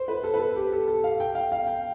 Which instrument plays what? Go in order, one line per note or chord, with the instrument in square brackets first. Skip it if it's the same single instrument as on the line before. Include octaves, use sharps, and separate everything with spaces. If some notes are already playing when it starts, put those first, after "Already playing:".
Already playing: [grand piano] C5
B4
A4
B4
A4
G4
A4
A4
F5
G5
F5
F5
G5